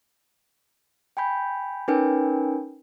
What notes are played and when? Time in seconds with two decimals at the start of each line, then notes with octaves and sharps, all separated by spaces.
1.17 G5 G#5 B5 G6
1.88 C#4 D#4 A#4 B4 G5 G#5